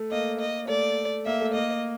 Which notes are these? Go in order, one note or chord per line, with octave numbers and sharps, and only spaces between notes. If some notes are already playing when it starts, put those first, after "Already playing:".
Already playing: A3
A#3 D#5
D#5
A3 D5
A#3 E5
A3
A#3 D#5